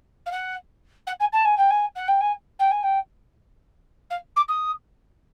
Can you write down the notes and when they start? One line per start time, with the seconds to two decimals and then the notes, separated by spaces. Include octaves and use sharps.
0.26 F5
0.32 F#5
1.07 F#5
1.20 G#5
1.33 A5
1.45 G#5
1.57 G5
1.70 G#5
1.95 F#5
2.08 G5
2.21 G#5
2.59 G5
2.71 G#5
2.83 G5
4.10 F5
4.36 D6
4.48 D#6